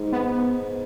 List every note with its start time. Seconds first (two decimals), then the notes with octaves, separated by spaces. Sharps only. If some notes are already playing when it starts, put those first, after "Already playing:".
Already playing: G#2
0.12 B3